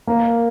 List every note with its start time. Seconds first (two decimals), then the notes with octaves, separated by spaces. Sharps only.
0.07 A#3 A#4 C#5 F5 A#5